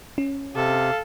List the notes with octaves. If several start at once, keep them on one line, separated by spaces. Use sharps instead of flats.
C#4
C3 A4 F5